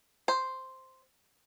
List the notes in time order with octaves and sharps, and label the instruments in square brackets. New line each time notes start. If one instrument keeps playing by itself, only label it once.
[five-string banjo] C5